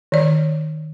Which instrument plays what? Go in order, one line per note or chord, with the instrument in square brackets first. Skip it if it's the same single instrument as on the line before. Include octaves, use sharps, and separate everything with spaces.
[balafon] D#3 D5